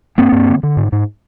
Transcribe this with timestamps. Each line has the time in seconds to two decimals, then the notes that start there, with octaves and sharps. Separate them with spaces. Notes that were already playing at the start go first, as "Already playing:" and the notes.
0.18 G2 A#3 C4
0.32 G2
0.48 D3
0.63 D3
0.77 G#2
0.92 G#2